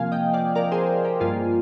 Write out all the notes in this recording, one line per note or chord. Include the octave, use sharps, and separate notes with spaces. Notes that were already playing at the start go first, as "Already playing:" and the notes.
Already playing: C3 F3 A#3 F5 G#5
D#5 G5
D5 F5
A#4 D5
G#4 C5
G4 A#4
G2 F3 A#3 F4 G#4